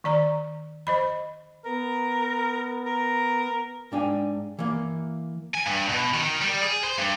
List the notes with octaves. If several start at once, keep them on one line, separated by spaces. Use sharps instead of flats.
D#3 D5 A#5
C5 D#5 B5
B3 A#4
A#4
G#2 D4 F5 G5 G#5
E3 A#3
G#5
G2
B2
D#3
G3
G#4
C5
G2